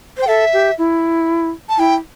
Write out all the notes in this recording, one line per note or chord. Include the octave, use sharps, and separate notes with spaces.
C5 G5
A4 E5
G4
E4
A5
E4 G5